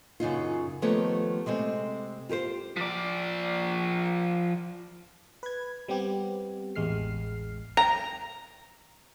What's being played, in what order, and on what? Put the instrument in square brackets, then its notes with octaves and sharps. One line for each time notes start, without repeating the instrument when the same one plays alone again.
[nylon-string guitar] F#2 C#3 D#4 F4
D#3 F3 A3 B3 G4 C#5
C3 G#3 A3 C4
F4 G4 B4 C5
[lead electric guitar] F3 D5
[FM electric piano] B4 G#6
G3 B3 C4 G4
A1 E2 G#3 F6 C7
[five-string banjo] A#5